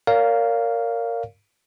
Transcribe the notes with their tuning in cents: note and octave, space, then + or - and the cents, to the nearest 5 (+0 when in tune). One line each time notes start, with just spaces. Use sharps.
A#4 -15 C#5 +45 F5 +0